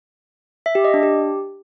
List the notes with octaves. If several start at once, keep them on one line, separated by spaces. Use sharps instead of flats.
E5
G4
D#5
D4
G4